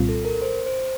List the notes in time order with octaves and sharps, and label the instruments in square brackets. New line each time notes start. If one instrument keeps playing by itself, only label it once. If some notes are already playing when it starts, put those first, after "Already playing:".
Already playing: [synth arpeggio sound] C2 A#2 G3 C4 F4
[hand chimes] A4
A#4
C5
C5